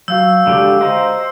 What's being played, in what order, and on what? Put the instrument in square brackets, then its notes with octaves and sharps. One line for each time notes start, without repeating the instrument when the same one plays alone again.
[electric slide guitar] F#3 [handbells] F#4 F5 G6 [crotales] E6
[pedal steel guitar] D3 G4 [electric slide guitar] G#3 D5
[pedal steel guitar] C5 [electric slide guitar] D#5 G5 A#5